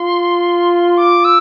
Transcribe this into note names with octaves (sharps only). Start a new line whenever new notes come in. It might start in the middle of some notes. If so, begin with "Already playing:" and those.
Already playing: F4 C6
D6
E6